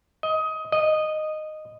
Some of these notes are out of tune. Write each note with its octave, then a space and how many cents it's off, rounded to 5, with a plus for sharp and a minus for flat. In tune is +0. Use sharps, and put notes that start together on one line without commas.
D#5 +20
D#5 -10